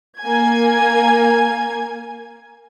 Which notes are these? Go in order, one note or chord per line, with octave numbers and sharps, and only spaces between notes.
A#3 G#5 G#6